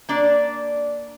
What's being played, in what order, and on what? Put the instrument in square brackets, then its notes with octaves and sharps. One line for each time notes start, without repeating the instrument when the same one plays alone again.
[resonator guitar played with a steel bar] A#3 D4 D5